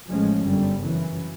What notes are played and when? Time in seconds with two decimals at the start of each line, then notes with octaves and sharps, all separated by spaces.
0.09 A1 A2 F3 G#3 C#4
0.44 G1 F#2 D3 G3
0.78 F#2 C#3 E3